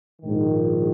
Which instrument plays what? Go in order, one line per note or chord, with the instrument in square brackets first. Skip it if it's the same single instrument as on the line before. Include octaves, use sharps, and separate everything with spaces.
[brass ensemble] A#1 G#2 D#3